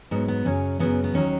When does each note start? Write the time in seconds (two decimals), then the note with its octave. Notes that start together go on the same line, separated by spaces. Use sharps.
0.11 G#2 F#3 B3
0.28 B3
0.45 F#2 C#3 F#3 C#4
0.79 F#2 C#3 F#3 B3
1.04 B3
1.14 D#2 D#3 F#3 C#4